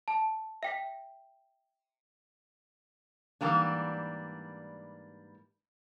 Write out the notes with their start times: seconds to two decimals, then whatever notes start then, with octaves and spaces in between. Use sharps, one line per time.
0.08 A5
0.63 E5 G5 B6
3.41 G#2 E3 G3 A#3 D4